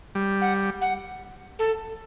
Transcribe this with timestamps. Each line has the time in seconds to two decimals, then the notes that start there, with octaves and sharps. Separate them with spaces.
0.15 G3
0.41 F#5
0.81 F#5
1.59 A4